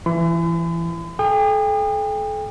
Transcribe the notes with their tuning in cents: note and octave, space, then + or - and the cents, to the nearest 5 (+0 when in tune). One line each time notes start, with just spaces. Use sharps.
E3 +25 B5 +45
A4 -40 G5 +35 D#6 -30